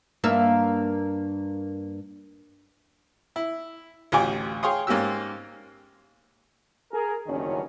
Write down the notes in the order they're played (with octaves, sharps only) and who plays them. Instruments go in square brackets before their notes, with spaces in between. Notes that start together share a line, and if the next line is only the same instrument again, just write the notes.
[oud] G2 A#3 E5
[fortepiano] E4
A1 D2 F4 G4 G#5 D6
G#4 C#5 F5 G5 C6 D#6
G#2 A#3 C#4 G4 E6
[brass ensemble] G#4 A#4
F#1 E2 G2 D#3 F#3 C#4